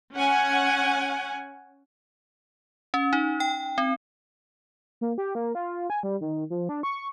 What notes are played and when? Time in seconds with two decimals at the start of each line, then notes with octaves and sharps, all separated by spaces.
0.16 C#4 F#5 G#5
2.94 C#4
3.13 D#4
3.40 G5
3.78 C4
5.01 A#3
5.18 G4
5.35 A#3
5.55 F4
5.90 G#5
6.03 G3
6.21 D#3
6.50 F3
6.69 D4
6.83 C#6